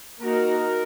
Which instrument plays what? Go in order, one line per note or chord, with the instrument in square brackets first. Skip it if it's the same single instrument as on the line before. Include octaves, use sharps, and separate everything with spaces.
[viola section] A#3 D#4 F#4 [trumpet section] A#4